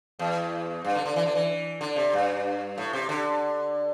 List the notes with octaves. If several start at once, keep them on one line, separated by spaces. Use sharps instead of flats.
E2
G2
D3
D3
E3
D3
E3
D3
C3
G2
A2
C3
D3